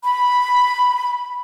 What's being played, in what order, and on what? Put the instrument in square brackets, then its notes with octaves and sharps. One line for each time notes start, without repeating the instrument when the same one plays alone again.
[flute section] B5